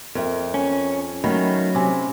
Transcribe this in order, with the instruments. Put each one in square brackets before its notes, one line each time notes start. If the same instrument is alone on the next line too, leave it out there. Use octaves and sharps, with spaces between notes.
[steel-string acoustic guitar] F2 [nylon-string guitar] A#4 E5
[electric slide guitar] C#4
[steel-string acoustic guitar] D#3 [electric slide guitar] F#3 [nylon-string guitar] A3 C#4 [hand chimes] B5
[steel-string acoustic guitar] C3 [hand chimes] G#5 D6